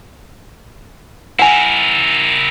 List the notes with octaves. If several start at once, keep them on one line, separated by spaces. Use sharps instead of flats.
E4 A#4 F#5 G#5